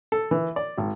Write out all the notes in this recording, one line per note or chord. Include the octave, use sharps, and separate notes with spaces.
A4
E3
D5
G#1